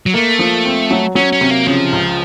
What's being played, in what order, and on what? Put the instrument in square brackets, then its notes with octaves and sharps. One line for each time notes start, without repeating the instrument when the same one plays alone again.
[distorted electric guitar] F#3
[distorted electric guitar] A3 [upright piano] A#3
[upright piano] F3
C4
F#3
[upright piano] F#3 [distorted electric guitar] C#4
[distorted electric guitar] C#4
[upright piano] C3
[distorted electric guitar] A#3
[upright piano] C#3 [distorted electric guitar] F3
[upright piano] C#2